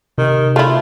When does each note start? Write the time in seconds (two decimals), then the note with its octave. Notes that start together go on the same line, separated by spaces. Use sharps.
0.18 C3 D#3
0.56 A3 E4 F4